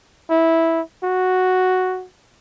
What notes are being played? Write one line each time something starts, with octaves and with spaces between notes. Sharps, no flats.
E4
F#4